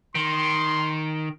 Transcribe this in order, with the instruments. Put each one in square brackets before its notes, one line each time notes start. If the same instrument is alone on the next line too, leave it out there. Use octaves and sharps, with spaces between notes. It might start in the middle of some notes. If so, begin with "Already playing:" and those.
[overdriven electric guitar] D#3 [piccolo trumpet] C6